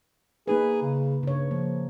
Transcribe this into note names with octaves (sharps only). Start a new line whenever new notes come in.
A#3 D#4 G#4 B4
C#3
G2 C#3 C#5
F3 A#3